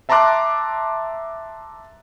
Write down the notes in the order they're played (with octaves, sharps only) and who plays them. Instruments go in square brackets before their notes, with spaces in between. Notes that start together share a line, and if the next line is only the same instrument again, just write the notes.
[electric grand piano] E5 A5 A#5 C6 D6 F#6